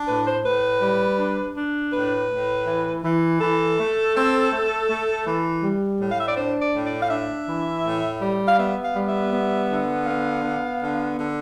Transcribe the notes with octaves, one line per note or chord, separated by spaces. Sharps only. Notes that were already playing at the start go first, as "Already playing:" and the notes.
Already playing: D4
A2 B4
C5
A2 B4
G3
D4
D4
A2 B4
A2
E3
E3
E3 A4
A3
C4
A3
A3
E3
G3
A2
F5
E5
D5
D4 C5
D5
A2
D5
F5
D4 E5
E3
A2
G3
F5
B3 E5
F5
G3
E5
B3
D3
B3 F5
B3
D3
D3